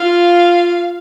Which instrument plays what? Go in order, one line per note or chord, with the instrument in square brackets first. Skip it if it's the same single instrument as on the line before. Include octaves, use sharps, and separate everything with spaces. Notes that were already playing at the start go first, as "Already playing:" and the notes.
Already playing: [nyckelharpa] F4 [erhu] F5